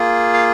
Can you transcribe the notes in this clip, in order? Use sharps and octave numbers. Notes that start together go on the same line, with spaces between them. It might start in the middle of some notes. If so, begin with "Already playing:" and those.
Already playing: A#3 F4 G#4
F5